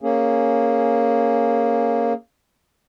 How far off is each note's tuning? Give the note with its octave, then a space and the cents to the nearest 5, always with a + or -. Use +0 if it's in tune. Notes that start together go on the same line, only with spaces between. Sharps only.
A#3 +0 C#4 -5 G#4 +0